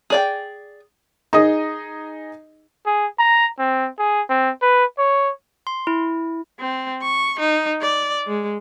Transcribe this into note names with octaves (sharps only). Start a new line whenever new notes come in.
G#4 D5 G5
D#4 G#4 D#5 D#6
G#4
A#5
C4
G#4
C4
B4
C#5
C6
E4
C4
C#6
D#4
D5
G#3